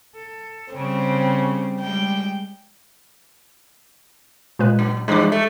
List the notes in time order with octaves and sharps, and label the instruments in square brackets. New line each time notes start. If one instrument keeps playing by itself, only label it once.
[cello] A4
[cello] C#3 G3 [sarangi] C4
[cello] G3 G#3 [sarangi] G5
[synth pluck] A#2 G#3 B4
[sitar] F#2
[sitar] E2 G2 F3 [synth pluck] G#3 D6
[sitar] A3